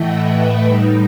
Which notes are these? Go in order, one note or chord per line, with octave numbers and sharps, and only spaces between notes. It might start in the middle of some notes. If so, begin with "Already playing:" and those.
Already playing: A2 E3 A3 D#5 E5 F#5 G5
B4
A2 G3 D#4